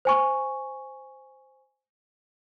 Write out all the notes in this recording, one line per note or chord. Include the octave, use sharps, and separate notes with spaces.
C5 G#5 C#6